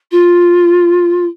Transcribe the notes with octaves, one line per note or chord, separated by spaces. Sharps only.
F4